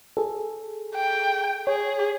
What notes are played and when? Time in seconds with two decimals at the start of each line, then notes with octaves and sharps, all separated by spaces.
0.17 G#4 A4
0.95 G5
1.67 G#4 C#5